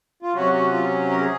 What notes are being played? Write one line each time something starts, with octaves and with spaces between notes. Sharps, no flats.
F4
C3 F#3 C#4 F#4
F#4
F4
A#4
G#4